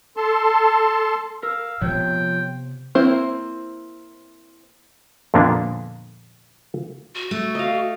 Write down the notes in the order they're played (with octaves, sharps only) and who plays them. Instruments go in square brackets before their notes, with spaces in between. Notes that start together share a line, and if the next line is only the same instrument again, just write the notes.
[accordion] A4 A5 C6
[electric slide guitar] A#4 [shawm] F5 [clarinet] E6
[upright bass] C3 B3 [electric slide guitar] F3 C#5 [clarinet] C5 [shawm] G5
[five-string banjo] A#3 C4 E4 C5
[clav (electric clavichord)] F2 A#2 D3 A#3 B3 D4
[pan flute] F#4
[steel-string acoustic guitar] A3
[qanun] D#5 F5